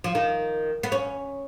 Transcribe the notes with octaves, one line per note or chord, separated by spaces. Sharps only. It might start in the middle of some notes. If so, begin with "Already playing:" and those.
F3
D#3
B3
C#4